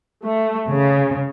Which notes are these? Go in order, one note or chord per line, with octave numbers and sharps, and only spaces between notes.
A3
C#3